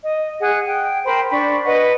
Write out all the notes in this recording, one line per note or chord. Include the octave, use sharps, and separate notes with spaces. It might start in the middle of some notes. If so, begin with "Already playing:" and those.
D#5
G#4 F#5 F#6
G5
A#4 C5 G5 B5
D4 B5 C#6
B4 D#5 F#5